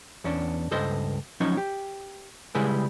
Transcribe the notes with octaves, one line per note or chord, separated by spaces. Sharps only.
E2 C#4 D4
C#2 G2 A4 C5 D#5
F3 F#3 C#4 D#4 C#5
G4
C#3 G3 G#3 E4 G#4 B4